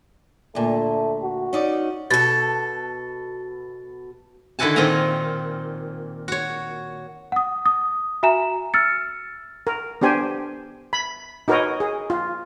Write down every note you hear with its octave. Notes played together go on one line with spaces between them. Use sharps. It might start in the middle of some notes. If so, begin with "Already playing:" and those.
D2 A#2 A3
F#4
C#4 D#4 D5
B2 A4 A6
D3 D#3 E4 F#4 G#5 A5
A#2 D#3 C4 F5 G#5 A#5
F#4 C#5
F#5 D#6
D#6
F#4 E5 G#5 A#5 E7
E6 F6 A6 C#7
A#4
B3 D4 G4 C5 G#5
B5
D#4 F#4 A#4 B4 C#5 D#5
G#4
F4